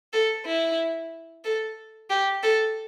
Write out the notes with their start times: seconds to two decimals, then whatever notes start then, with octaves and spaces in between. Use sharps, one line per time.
0.13 A4
0.46 E4
1.44 A4
2.10 G4
2.43 A4